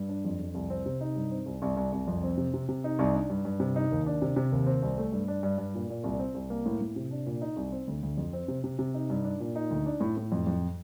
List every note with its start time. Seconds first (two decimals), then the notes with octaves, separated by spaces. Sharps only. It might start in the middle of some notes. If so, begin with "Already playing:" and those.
Already playing: G2
0.09 D4
0.25 F2
0.39 F2
0.54 C2
0.70 C4
0.86 C3
1.01 D#4
1.16 G2
1.31 C4
1.46 C2
1.62 C2
1.77 C2
1.92 C2
2.08 F2
2.23 C4
2.37 C3
2.54 C3
2.69 C3
2.84 D#4
2.99 C2
3.14 D4
3.30 G2
3.45 G2
3.60 C3
3.76 D#4
3.91 D#2
4.06 D4
4.22 C3
4.36 C3
4.52 D#2
4.66 C4
4.82 C2
4.98 A3
5.12 G2
5.28 D4
5.43 G2
5.58 G2
5.74 A#2
5.90 A#2
6.04 C2
6.19 C4
6.35 C2
6.50 A#3
6.66 A2
6.80 A2
6.96 C3
7.11 D4
7.26 A#2
7.42 D#4
7.56 C2
7.72 C4
7.87 D2
8.03 D2
8.17 F2
8.33 C4
8.48 C3
8.64 C3
8.79 C3
8.94 D#4
9.10 G2
9.24 D4
9.40 A#2
9.56 D#4
9.71 D2
9.86 D4
10.00 A2
10.17 A2
10.32 F2
10.47 F2